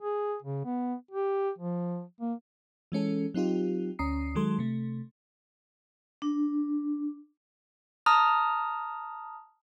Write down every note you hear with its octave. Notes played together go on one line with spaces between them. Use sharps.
G#4
C#3
B3
G4
F3
A#3
E3 G#3 C#4 A4
F#3 C4 D#4 F4 G4
D2 C#4 A#5 D#6 C7
D#3 F#3 G#3 A4 C6
C3 A3
D4
A5 A#5 D#6 F6